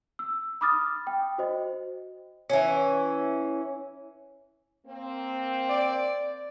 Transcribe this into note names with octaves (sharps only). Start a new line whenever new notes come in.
E6
B5 D6 D#6 F6 A6
G5
F#4 C5 D#5
E3 C#4
A#3 C4
D5